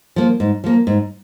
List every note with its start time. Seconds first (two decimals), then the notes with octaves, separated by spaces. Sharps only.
0.16 F3 A#3
0.40 G#2
0.64 F3 A#3
0.87 G#2